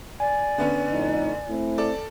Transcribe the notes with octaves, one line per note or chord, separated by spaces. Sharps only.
D5 G#5
D3 B3 C#4
F2 A2 D#4
A3 C4 E4
A4 D5